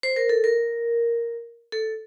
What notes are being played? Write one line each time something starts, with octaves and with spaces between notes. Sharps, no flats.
C5
A#4
A4
A#4
A4